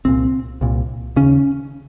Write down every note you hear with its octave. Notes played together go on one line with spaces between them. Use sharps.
C2 A#2 C4
C2 A#2
D#2 C#3 C#4